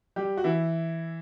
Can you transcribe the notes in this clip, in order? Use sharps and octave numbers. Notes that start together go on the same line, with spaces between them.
G3 G4
F#4
E3 E4